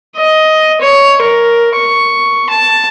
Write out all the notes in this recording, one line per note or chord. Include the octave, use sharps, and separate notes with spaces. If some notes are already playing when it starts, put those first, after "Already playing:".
D#5
C#5
A#4
C#6
A5